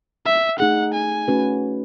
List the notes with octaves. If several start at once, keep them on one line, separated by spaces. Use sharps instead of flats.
E5
A3 D#4 G#4 F#5
G#5
A3 C#4 F#4 B4